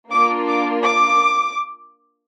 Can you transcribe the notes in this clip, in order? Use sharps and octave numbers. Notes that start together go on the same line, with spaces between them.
A#3 D4 F4 D6
D6
D6